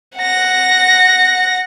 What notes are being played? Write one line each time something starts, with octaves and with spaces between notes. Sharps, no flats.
F#5 A#6